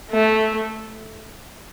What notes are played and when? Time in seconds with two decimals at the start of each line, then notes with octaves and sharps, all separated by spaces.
0.11 A3